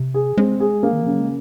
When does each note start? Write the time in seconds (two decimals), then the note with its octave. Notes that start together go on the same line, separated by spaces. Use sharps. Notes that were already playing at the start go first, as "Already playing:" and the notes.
Already playing: C3
0.14 G#4
0.37 G#3 C4
0.60 G#4
0.83 A#3
0.93 D#3
1.02 C#3 F3
1.11 F#3
1.20 G#3